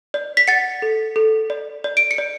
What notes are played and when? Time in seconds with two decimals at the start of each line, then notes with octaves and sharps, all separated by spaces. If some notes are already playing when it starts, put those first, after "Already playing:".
0.14 D5
0.37 B6
0.47 F#5 A6 C#7
0.82 A4
1.16 A4
1.50 D5
1.84 D5
1.97 D7
2.11 C#7
2.18 D5